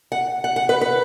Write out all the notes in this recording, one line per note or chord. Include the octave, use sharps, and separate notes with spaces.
F#5
F#5
F#5
B4
B4